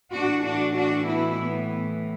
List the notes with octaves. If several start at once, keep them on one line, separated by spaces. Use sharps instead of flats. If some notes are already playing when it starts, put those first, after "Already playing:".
A2 E3 D4 F#4
D4 F#4
D4 F#4
B3 E4
B3